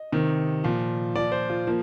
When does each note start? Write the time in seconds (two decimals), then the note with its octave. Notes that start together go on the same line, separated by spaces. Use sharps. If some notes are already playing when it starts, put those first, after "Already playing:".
Already playing: D#5
0.12 C3 D#3
0.64 A#2 F3
1.15 A#2 F3 D5
1.32 C5
1.49 F4
1.67 F3 A#3